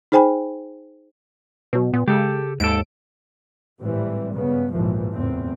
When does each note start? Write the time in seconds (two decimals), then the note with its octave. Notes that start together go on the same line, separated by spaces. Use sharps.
0.12 D#4 G#4 C5 G5 G#5 B5
1.73 B2 F#3 B3
1.93 A#2 B3
2.08 C#3 G#3 G4 A4
2.60 D#2 G#2 A4 D7
3.81 G#1 A2 E3 G3 C4
4.31 G2 C#3 B3
4.71 A#1 D#2 G#2 B2 E3 F3
5.14 F#1 E2 A2 C4